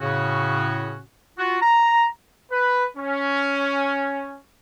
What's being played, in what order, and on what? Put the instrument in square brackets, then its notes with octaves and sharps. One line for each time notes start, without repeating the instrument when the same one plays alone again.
[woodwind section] A2 C#3 C#4 F#4
F4 F#4
A#5
[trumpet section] B4
C#4